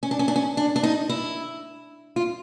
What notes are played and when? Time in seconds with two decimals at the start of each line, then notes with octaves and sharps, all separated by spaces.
0.03 C#4
0.11 D4
0.19 C#4
0.28 D4
0.36 C#4
0.57 D4
0.76 D4
0.83 D#4
1.09 E4
2.16 F4